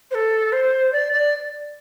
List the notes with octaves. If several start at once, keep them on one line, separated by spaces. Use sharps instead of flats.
C5
A4
C5
D5
D5